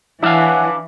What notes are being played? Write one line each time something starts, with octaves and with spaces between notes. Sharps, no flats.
E3 D4 E4 C#5 F5 F#5 G#5